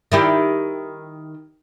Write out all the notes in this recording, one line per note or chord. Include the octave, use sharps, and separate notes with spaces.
D#3 E4 G4